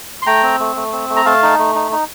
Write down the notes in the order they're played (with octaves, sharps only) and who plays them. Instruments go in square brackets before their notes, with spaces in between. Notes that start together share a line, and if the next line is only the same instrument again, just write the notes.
[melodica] C6
A3 G5 A#5
C4
A3
A3
C4
A3
A#5
A3 F5 A5
D#4
A3
D#4
D#4